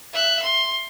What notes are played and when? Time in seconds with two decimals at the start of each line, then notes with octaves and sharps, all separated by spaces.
0.13 E5 F#6
0.42 C6